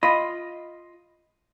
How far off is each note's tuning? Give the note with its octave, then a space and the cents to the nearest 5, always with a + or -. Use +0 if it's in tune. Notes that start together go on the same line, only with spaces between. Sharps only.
F4 +0 D#5 +5 B5 +0